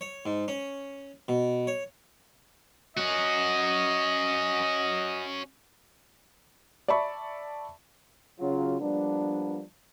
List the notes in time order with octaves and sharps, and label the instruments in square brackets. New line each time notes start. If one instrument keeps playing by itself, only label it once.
[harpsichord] C#5
G#2
C#4
B2
C#5
[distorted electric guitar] C#4 F#4 [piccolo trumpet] D#5
[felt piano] D5 E5 A5 B5 C#6
[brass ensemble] C#3 F#3 F4
F3 G3 A#3 B3 D4